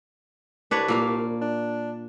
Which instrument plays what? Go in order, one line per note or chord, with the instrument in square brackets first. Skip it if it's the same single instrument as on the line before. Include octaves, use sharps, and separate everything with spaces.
[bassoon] C2 [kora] D4 B4 C#5
[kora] A#2 A#3 F5
[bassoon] D4